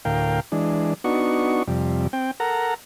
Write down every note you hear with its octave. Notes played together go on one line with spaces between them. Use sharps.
D2 A2 A#4 F5 G5
E3 G#3 D4
B3 D4 D#4 F#4 C#6
F2 C3 G3
C4 G5
A4 A#4 F#5 A#5